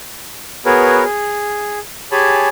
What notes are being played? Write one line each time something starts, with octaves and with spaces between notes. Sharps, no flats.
B3 F#4 G#4 A#4 B4 C#5
G#4
G4 G#4 C#5 G#5 A5 B5